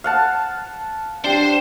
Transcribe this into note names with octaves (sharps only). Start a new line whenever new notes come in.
F5 F#5 A5
D4 G4 C5 C6